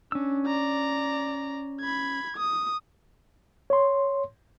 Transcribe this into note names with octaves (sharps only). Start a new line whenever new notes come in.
C#4 D4 E6
D5 A#5
B5 G#6
D#6
C#5 C6